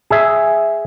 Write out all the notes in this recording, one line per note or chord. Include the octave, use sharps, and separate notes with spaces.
G#4 E5